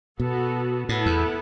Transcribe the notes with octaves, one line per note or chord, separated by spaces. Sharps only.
B2 B3 F#4 A4
A2 B3 E4 A4
E2